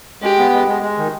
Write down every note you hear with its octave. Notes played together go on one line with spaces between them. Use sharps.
G#3 G4
B3
G#3
G#3
G#3
D#3